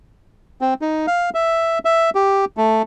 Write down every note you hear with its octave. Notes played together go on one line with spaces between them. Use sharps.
C4
D#4
F5
E5
E5
G4
A3